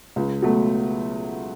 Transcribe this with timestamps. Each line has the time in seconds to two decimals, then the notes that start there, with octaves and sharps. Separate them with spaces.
0.16 C#2
0.42 B2 F#3 A3